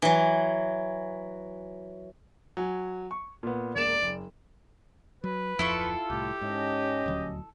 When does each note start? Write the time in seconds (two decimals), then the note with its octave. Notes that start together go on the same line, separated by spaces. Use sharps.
0.02 E3 F#3
2.57 F#3 G#5
3.11 C#6
3.43 A#2 B3
3.76 E1 A#3 D5 E7
4.02 F#1
5.24 F#3 B4
5.59 D1 F2 F3 E4 F4 A4 C#6
6.10 C2 A2 G4
6.41 G#2 C#4 D#5
7.06 D#1 D2 F#3